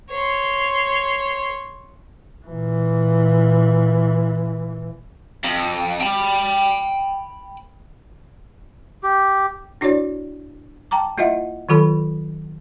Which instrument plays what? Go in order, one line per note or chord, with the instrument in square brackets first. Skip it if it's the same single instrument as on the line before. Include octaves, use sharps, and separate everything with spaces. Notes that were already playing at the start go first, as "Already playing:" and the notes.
[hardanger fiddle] C#5 C6
[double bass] A#2 E3
[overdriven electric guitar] F2
G5 B5
[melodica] G4
[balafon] D4 E4 F#4 C#5 D5
G5 A5 A#5 D6
A#3 E4 F4 D#5 E5 F#5
D#3 F#3 F4 A4 B5